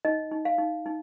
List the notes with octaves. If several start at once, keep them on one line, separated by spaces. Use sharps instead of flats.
D#4 D#5
D#4
F5
D#4
D#4